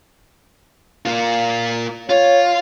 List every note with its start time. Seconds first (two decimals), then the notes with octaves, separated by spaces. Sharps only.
1.05 A#3 F4
2.10 F4 C#5